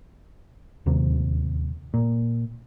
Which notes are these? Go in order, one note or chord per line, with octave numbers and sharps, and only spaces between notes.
D1 D#2 C3
A#2